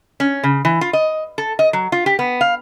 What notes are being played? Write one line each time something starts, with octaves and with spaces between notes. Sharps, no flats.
C#4
C#3
E3
F4
D#5
A4
D#5
F#3
F4
G4
B3
F5